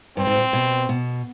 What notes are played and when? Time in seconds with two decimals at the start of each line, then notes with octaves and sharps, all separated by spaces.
0.17 G2 C4
0.27 G#2
0.36 A#2
0.53 B2
0.89 B2